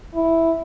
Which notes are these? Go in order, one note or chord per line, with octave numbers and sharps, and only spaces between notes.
E4